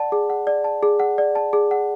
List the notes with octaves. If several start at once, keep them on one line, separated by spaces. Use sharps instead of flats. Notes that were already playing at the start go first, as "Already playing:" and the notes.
Already playing: D5 F#5 A5
G#4
F#5
D5
A5
G#4
F#5
D5
A5
G#4
F#5